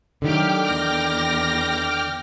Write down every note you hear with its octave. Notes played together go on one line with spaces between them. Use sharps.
D3 D#3 F#3 A3 G4 G5 D6 F6
E2 A#6